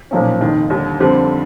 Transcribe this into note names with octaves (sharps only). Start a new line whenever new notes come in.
B1 A#2 F3 A#3 C#4
F1 D#2 D#3
D#2 D3 G3
F2 D3 G3 C4